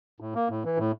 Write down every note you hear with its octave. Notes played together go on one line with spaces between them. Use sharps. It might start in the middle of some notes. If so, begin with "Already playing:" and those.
A2
A#3
A2
E3
A2